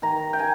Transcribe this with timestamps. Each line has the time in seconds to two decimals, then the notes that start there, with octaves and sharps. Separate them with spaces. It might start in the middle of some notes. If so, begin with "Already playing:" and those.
0.02 D#3 A#5
0.33 G5
0.39 G#5